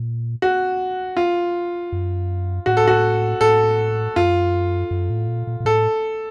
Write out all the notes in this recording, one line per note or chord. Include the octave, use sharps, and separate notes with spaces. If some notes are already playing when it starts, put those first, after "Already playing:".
Already playing: A#2
F#4
F4
F#2
A2 F#4
A4
F#4
A2 A4
F#2 F4
F#2
A2
A#2
A#2
A#2
A2 A4